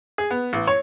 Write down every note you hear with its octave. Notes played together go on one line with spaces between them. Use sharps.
G#4
B3
A1
C#5